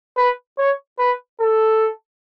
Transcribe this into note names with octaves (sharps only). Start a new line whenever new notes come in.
B4
C#5
B4
A4